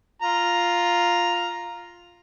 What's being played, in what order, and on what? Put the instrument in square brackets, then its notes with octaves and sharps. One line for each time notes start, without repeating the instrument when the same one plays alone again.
[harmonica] F4 A#5